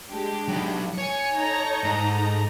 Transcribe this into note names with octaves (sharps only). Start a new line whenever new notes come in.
G#3 D4 G4
F#3 D#4
C#5 G#5 C#7
D#4 A4 A#5
G#2